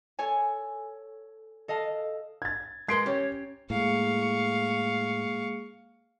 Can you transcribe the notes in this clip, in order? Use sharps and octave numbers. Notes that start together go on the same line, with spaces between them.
A4 C#5 G#5
A4 D#5 F5 A5
G#6 A6
G#3 A#4 B4 C6 G#6 C7 D7
C#4 G4 C#5
A2 G#3 A#3 G#4 F5 C#6